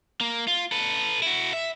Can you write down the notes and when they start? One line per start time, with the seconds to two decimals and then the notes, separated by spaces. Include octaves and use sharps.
0.21 A#3
0.48 F4
0.72 A4 B4
1.22 E4 F#4
1.53 E5